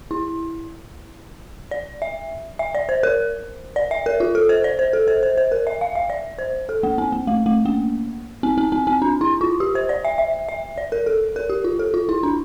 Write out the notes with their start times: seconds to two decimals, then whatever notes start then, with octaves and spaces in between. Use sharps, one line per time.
0.11 E4
1.71 D5
2.02 E5
2.59 E5
2.75 D5
2.89 C5
3.03 A#4
3.76 D5
3.91 E5
4.06 A#4
4.20 F4
4.35 A4
4.49 C5
4.64 D5
4.79 C5
4.93 A4
5.08 C5
5.23 C5
5.38 C5
5.52 A#4
5.67 E5
5.81 F5
5.95 E5
6.10 D5
6.39 C5
6.69 A4
6.83 A#3
6.98 C4
7.12 A#3
7.27 A3
7.46 A3
7.65 A#3
8.43 C4
8.58 C4
8.72 C4
8.87 C4
9.02 D4
9.21 E4
9.41 F4
9.60 G4
9.75 C5
9.89 D5
10.05 E5
10.18 E5
10.49 E5
10.78 D5
10.92 A#4
11.06 A4
11.36 A#4
11.50 G4
11.64 F4
11.79 A4
11.94 F4
12.09 E4
12.23 D4